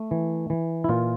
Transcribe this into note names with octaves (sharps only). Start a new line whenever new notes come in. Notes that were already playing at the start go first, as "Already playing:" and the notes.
Already playing: A3
E3
E3
E4
A#2 F4